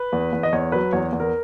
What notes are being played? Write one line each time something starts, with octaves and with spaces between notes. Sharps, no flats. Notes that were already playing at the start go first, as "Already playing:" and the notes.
Already playing: B4
E2
E2
D#5
E2 C#5
F#3 B4
E2 C#5
E2
A#4